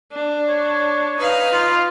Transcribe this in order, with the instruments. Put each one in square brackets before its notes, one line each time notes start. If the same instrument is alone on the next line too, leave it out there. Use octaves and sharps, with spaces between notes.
[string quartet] D4
[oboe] C#5
[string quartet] D#4 B4 F5
[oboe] F4